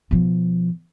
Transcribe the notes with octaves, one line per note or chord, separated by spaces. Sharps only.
B2 F3